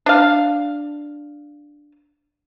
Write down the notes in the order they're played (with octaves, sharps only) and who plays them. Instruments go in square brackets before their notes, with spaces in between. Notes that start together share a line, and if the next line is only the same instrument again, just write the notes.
[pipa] D4 F5